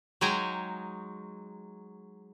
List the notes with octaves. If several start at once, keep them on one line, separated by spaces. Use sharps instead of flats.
F#3 G#3 D#4 G5 G#5 A#5